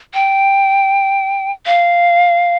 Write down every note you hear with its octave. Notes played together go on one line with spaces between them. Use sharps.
G5
F5